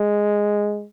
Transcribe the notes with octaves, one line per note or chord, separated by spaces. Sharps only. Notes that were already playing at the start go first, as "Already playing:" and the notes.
Already playing: G#3